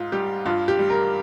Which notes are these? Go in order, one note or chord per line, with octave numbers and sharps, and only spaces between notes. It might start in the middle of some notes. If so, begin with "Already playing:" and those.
Already playing: G#2 F4
G3 G4
G2 F4
G4
G3
A#4